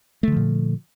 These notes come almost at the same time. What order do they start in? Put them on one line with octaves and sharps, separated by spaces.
A3 D3 F3 A#2